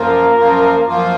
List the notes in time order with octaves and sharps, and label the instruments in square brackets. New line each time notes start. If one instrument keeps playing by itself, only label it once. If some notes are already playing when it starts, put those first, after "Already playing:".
Already playing: [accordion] F#2 F3 A#3 F4 [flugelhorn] A#4
[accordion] F#2 F3 A#3 F4
F#2 F3 A#3 F4